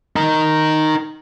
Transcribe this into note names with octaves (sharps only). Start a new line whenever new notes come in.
D#4 A#4